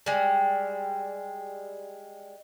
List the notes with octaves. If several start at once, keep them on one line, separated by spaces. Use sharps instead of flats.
G3 G#3